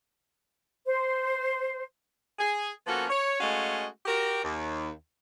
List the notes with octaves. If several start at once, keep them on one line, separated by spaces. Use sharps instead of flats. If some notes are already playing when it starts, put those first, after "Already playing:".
C5
G#4
F3 A#3 B3 C#4 F#4 A4
C#5
G#3 A3 C#4 F#4 D#5 F5
F#4 G4 A#4
D#2